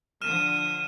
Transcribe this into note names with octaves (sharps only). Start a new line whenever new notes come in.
D3 F3 D#6 F6 D#7 E7